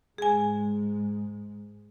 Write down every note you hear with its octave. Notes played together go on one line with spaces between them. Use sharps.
G#2 G#3 G#4 G#5